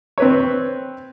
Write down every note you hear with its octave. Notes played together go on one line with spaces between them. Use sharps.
C4 B4 C#5